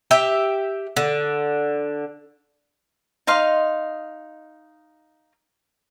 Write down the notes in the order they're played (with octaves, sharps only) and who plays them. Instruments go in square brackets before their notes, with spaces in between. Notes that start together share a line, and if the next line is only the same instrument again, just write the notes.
[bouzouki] G4 E5 G5
D3
[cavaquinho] D#4 D#5 F5 C6